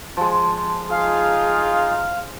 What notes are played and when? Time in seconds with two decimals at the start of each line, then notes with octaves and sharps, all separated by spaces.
0.17 F3 G#3
0.91 D#4 F4 G#4 F5